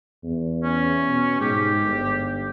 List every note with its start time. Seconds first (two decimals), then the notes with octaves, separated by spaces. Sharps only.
0.24 E2
0.64 C#4
1.09 B2
1.41 G#2 G4
1.83 G1